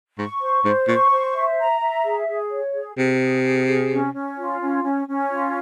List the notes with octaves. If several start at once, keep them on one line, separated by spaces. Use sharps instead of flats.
G#2 C#6
C5
G#2 C5
A#2 C#6
C5
E5
A#5
E5
G#4
G#4
C#5
G#4
C3 G#4
G#4
G#4
G#4
C#4
C#4
F4
C#4
C#4
C#4
F4